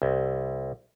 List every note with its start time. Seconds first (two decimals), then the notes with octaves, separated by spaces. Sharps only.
0.02 C2